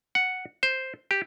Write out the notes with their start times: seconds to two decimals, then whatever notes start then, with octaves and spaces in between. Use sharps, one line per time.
0.15 F#5
0.63 C5
1.11 G4